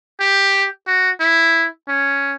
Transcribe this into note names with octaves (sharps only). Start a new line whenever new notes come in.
G4
F#4
E4
C#4